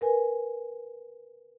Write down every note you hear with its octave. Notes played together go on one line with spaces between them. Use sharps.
A#4 B4 G#5